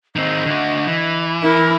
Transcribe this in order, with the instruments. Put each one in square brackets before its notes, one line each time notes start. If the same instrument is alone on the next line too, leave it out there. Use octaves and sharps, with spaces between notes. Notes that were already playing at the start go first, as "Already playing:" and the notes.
[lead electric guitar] D#3 C4 [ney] D#5
[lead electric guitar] D3 F#4
E3
[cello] E4 [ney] A#4